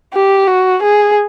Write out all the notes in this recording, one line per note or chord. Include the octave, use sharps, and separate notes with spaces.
G4
F#4
G#4